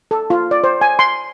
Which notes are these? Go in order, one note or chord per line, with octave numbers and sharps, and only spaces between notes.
A4
F4
D5
C5
G#5
C6